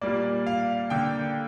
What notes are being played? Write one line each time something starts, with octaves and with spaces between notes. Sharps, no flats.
A#2 G3 A#3 D5
F5
D3 A#3 G5